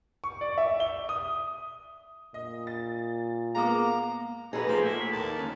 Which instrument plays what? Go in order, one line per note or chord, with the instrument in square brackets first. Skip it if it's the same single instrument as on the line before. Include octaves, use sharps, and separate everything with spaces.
[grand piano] C#6
D5
E5
G7
D#6
[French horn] A#2 [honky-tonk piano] D#5
[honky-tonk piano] A6
[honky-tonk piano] G#3 B3 D6 [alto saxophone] A#3 [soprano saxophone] A#5
[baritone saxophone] B2 [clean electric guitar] D#4 A4 [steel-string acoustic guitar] G#4 B4 [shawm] A#5
[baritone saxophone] F3 [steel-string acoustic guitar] A#3 [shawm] C6
[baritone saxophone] A2 [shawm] E4
[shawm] B5
[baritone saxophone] D#2 [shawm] A5
[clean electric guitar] D2 C#4